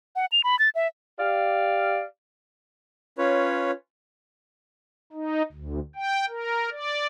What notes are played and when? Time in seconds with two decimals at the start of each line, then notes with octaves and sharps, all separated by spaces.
0.16 F#5
0.32 F7
0.44 B5
0.59 A6
0.75 E5
1.19 G4 D5 F5
3.18 C#4 F4 B4 C#5
5.13 D#4
5.52 D2
5.96 G5
6.29 A#4
6.71 D5